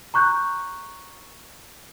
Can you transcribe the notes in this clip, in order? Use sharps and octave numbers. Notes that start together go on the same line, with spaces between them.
A#5 C#6 F#6 G6